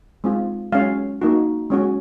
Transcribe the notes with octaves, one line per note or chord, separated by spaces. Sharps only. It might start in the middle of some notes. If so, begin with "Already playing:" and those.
G#3 C4 F4
G#3 C#4 F#4 F5
A#3 D#4 F#4
G#3 C#4 F#4